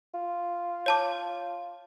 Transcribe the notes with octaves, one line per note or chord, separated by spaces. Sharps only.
F4
C#5 A5 D6